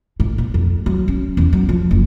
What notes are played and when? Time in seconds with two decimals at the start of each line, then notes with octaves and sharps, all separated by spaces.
0.20 G#2
0.38 A#2
0.54 F2
0.86 F#3
1.08 C#4
1.37 E2
1.53 F#3
1.69 F3
1.91 F#1